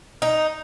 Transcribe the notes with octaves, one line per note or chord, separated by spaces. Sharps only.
D#4